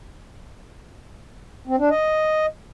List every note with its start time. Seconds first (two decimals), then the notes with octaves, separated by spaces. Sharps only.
1.67 C4
1.79 D4
1.90 D#5